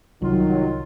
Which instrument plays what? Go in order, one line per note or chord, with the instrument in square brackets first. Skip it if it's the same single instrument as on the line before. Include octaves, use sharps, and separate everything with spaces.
[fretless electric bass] C2 [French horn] D#3 [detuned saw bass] F#3 [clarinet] F4